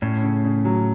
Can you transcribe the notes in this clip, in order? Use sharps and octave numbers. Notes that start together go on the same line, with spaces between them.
A2 C#4
C#3
C#3
F#3